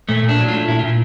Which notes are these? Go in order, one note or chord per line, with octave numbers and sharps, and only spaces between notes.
A#2 A3
A#2
D4
F#3
F4
A3
A#2 E4
A#2 F4